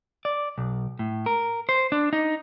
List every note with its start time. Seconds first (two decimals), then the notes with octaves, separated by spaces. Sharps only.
0.25 D5
0.58 B1
0.99 A2
1.26 A#4
1.69 C5
1.92 D4
2.13 D#4